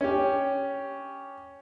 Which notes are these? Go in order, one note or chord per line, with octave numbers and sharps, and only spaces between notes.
C#4 G4